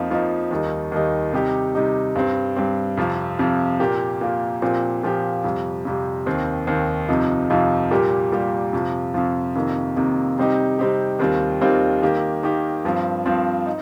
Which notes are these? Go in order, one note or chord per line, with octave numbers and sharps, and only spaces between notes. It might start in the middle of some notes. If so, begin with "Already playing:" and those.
Already playing: F2 F3 A#3 D#4
F2 F3 A#3 D#4
D#2 D#3 G3 D#4
D#2 D#3 G3 D#4
C3 G3 D#4 G4
C3 G3 D#4 G4
G2 G3 C4
G2 G3 C4
F2 C3 F3
F2 C3 F3
A#2 A#3 G4
A#2 A#3 G4
A#2 F3 C4 G4
A#2 F3 C4 G4
F2 C3 G3
F2 C3 G3
D#2 D#3 C4
D#2 D#3 C4
F2 C3 F3 D#4
F2 C3 F3 D#4
A#2 G3 A#3 G4
A#2 G3 A#3 G4
F2 C3 F3
F2 C3 F3
F2 C3 D#3 A#3
F2 C3 D#3 A#3
C3 G3 C4 D#4 G4
C3 G3 C4 D#4 G4
D#2 D#3 G3 C4 F4
D#2 D#3 G3 C4 F4
D#3 A#3 G4
D#3 A#3 G4
G2 F3 C4
G2 F3 C4
D#4